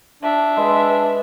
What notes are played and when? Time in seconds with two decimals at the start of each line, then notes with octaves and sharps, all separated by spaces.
0.23 D4 E5
0.57 G#3 B4